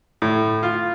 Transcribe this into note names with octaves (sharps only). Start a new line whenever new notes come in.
A2
F4